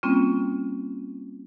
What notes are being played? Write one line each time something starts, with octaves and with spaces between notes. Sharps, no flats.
G3 A#3 C4 C#4 F4